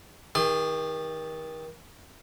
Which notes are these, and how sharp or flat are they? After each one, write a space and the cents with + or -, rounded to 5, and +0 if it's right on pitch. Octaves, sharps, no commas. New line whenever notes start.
D#3 +35 G#4 -40 C6 -15